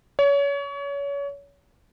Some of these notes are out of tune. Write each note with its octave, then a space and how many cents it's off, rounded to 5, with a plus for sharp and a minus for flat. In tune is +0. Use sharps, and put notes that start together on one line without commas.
C#5 +30